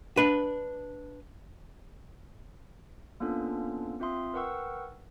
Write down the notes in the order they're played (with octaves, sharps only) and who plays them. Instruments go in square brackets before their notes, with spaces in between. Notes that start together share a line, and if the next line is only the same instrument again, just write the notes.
[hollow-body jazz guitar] D4 B4
[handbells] A#3 B3 C#4 D4 F4 A4
C4 F4 E5 C6 D#6
A#4 B4 F#5 G5 C#6 E6